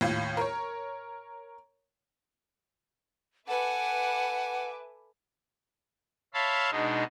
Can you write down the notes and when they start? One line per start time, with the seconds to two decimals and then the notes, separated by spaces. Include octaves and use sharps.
0.01 D#2 A2 F4
0.37 A#4 C#5
3.48 A4 B4 E5 F#5 G#5 D6
6.34 C#5 E5 F5 A5 B5 C6
6.71 B2 G#3 D4 D#4